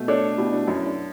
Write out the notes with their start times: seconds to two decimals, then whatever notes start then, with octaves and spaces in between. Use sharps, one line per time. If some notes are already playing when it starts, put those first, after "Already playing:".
Already playing: B2 A3
0.08 D4 A4 C#5
0.37 B2 E4 G4
0.52 D4 F#4
0.67 F#2 C#4 E4
0.86 D4 F#4